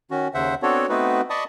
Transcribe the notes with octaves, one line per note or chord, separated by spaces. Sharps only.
D#3 C#4 F#4
D#2 C#3 C5 E5 F#5
B3 C4 D4 F#4 A4 C#5
A3 B3 C4 D#4 F#4 B4
D5 D#5 A5 B5 C#6 D#6